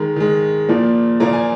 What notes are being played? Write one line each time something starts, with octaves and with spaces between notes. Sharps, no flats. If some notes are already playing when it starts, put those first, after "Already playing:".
Already playing: D#3 G#3 A#5
D#3 G#3
A#2 F3 A#3
A#2 F3 A#3 A#5
G#5